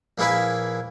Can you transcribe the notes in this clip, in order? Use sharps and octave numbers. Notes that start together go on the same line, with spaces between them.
A#1 A#3 E4 G#4 B4 E5